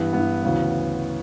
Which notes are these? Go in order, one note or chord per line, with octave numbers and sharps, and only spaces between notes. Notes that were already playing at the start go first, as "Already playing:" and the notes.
Already playing: G2 E3 B3
G2 E3 B3
D2 C#3 E3